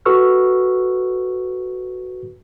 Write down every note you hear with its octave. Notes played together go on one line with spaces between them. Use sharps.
F#4 A4 B4 C#6 E6 F6